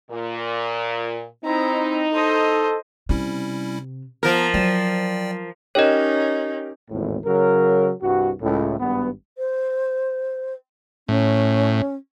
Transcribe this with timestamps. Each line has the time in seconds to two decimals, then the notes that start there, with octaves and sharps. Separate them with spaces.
0.11 A#2
1.45 C4 D#4 E4 A#5
2.14 A4 C5 D#5
3.09 C3 G3 C#4 E4
4.23 F3 B3 A#4 A#5
4.54 F#3 D5 G5
5.75 C#4 D#4 G4 A#4 C#5 D#5
6.90 G#1 E2 A2
7.25 C#3 F#3 A#4
8.02 C2 G2 F#4
8.42 C#2 A2
8.80 G#1 G2 B3
9.36 C5
11.08 A2 C#4